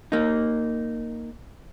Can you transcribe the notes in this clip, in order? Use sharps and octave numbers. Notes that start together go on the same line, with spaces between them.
A#3 D#4